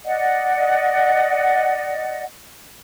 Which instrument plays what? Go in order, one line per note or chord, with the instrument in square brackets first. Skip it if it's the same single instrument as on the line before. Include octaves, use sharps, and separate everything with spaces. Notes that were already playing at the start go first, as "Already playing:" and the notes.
[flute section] D5 D#5 F#5